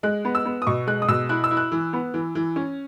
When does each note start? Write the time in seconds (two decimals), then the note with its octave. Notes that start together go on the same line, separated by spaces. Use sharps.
0.03 G#3 F#6
0.25 B3
0.35 E6
0.46 B3
0.62 D#6
0.67 B2 C#6
0.87 G#3 F#6
1.02 D#6
1.08 B2 E6
1.29 E4 F#6
1.44 E6
1.51 E4
1.57 F#6
1.72 E3
1.93 B3
2.14 E3
2.35 E3
2.56 C#4